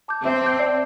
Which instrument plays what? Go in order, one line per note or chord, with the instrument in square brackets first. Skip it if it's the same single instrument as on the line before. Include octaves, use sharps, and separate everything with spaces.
[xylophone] A5 D6 G6
[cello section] C4 [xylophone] E5
[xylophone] A5 D6 G6
D5